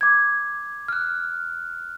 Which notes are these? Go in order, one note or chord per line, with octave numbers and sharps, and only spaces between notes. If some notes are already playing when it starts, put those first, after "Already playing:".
D6 G#6
F6 F#6